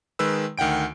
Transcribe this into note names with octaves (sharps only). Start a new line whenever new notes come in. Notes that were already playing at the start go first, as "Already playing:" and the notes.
D#3 G#3 B4 E6
D2 D#3 F#5 G5 D7